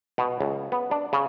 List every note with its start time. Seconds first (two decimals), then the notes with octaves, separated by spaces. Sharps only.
0.18 B2
0.40 C#2
0.72 B3
0.91 D4
1.13 C#3